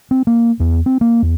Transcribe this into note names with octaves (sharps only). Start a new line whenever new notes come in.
C4
A#3
E2
C4
A#3
E2